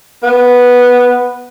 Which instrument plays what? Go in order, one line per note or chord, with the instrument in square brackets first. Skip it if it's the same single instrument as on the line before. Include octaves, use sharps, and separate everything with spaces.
[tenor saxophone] B3